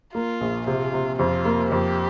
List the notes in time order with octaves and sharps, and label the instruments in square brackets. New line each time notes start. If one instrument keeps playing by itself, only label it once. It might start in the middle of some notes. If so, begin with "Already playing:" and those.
[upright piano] A#3 [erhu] F4
[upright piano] A#1
[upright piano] C3 [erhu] F4
[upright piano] C3
[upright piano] F2 [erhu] F4
[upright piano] A#3
[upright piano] F2 [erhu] G4